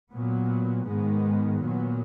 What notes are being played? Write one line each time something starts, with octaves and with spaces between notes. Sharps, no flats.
A#2 F#3 B3
G#2 D#3 G#3 B3
A#2 F#3 B3